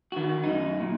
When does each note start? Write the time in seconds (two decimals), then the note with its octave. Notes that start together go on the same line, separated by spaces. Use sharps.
0.12 D#3 F#4
0.44 F#2 D#4
0.80 A#2